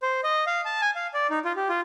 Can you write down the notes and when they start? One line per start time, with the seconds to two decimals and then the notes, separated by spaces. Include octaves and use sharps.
0.02 C5
0.24 D#5
0.47 F5
0.65 A5
0.81 G#5
0.95 F5
1.14 D5
1.30 D#4
1.45 F4
1.56 G4
1.69 F4